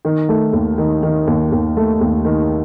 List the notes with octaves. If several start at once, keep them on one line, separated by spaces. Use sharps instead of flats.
D#3
A3
D#2
D#3
D#3
D#2
D#2
A3
D#2
D#3